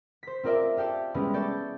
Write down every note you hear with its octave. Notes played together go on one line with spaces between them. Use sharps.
C5 B6
C4 F4 A#4 D5 E5
F4 G4 A4 D5
G3 G#3 B3 C#4 E4
A4 D5 C#6 G6 A6